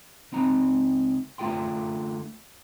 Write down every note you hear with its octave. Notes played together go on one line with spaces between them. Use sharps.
C#2 C4 D#4 A#5
D3 A3 F4 G#4 G5 C6